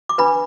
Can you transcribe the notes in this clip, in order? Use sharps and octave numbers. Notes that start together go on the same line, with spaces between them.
D6
D4 B4 B5